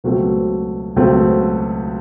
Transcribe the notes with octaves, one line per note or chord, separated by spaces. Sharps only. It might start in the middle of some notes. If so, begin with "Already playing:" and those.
C#2 B2 F#3 A3 C4
C#2 B2 F#3 A3 C4